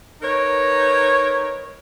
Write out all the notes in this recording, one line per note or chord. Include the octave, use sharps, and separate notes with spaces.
D#4 A#4 B4 C#5